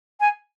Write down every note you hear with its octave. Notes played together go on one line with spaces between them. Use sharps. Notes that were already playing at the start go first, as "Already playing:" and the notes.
G#5